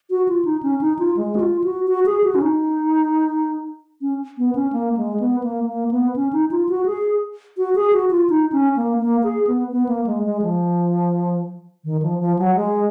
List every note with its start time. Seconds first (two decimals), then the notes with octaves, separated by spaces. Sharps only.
0.10 F#4
0.28 F4
0.45 D#4
0.63 C#4
0.81 D#4
0.99 F4
1.17 G#3
1.36 F#4
1.40 F4
1.64 F#4
1.87 F#4
2.06 G#4
2.24 F#4
2.35 C#4
2.42 D#4
4.01 C#4
4.38 B3
4.55 C#4
4.73 A#3
4.97 G#3
5.20 B3
5.44 A#3
5.68 A#3
5.91 B3
6.16 C#4
6.33 D#4
6.51 F4
6.69 F#4
6.86 G#4
7.57 F#4
7.75 G#4
7.93 F#4
8.11 F4
8.30 D#4
8.52 C#4
8.77 A#3
9.00 A#3
9.23 G#4
9.47 B3
9.72 B3
9.89 A#3
10.07 G#3
10.25 G#3
10.42 F3
11.85 D#3
12.02 F3
12.20 F3
12.39 F#3
12.56 G#3